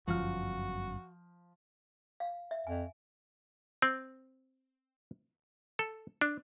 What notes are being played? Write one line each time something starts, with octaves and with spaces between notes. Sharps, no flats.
G1 F#2 F3 F#4 F6
F5
E5
F2 G#5
C4
A4
D4